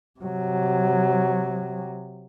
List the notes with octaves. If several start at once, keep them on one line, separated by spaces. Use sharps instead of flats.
C3 F#3